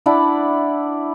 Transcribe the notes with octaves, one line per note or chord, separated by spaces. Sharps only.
D4 E4 D5 F#5